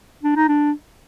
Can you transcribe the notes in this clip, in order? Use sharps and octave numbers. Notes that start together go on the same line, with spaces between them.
D4
D#4
D4